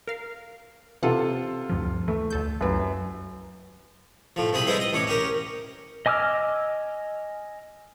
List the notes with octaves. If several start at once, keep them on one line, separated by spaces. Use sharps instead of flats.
A#4 F5
C3 E3 F4 A4 F#5
D2 G2 F3
E3 A3
D2 A4 G6
C2 F#2 B4
A2 F3
C2 C4 G#4 B5
G3 G#3 E4 B4 C5
D#5
A1 C#5 D6
C#4 G4 A#4
D#5 G#5 D6 E6 F6